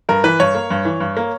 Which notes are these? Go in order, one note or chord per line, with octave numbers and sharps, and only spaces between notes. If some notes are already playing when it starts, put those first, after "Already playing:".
G2 A#4
E3 B4
G2 C#5
A#3
G2
E3
G2
A#3